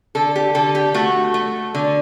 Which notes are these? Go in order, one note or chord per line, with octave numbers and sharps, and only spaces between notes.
D3 A4
G4
D3 A4
G4
A3 F#4
A3
D3